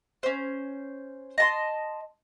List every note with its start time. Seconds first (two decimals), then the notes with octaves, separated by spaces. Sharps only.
0.23 C#4 C5
1.38 D#5 A5 C6